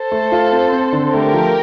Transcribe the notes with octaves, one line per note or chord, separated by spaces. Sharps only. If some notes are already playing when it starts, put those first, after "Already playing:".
Already playing: A4 C5
A3
F4
C4
C4
D3
A3 G4 A#4
F3